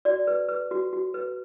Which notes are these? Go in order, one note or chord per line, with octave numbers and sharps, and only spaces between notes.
F#4 D5
B4
B4
F#4
F#4
B4